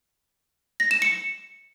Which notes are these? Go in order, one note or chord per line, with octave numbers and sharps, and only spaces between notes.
A#6
E7
C#7